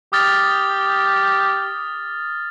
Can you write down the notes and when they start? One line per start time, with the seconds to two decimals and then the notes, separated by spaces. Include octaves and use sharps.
0.13 G4 D#6 F6 A6